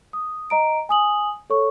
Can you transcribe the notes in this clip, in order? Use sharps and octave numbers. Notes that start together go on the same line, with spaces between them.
D#6
D#5 A#5 D7
G#5 D#6 F#7
A4 C#5 C#6